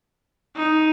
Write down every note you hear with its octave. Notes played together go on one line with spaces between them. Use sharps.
D#4